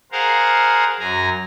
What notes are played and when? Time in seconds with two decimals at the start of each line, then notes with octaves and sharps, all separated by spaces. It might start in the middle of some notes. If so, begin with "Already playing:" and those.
0.12 G#4 A#4 C5 F5 F#5
1.00 F#2 G#5 A#5